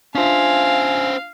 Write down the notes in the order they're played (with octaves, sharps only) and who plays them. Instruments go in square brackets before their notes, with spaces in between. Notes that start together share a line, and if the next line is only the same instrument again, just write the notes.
[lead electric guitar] C#4 C5 [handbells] D4 F4 E5 [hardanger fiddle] F5 [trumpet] G#5